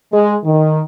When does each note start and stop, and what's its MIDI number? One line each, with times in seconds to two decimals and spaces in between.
0.12 0.36 56
0.45 0.82 51